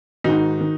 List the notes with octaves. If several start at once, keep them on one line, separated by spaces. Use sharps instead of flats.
G#2 D#3 D#4 F#4
D#3